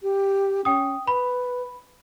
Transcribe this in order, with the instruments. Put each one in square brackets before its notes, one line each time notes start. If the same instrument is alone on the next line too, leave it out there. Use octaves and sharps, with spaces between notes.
[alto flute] G4
[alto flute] C#4 [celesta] G5 D#6
[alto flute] B4 [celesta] B5